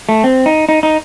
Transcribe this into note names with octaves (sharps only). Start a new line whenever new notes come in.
A3
C4
D#4
D#4
D#4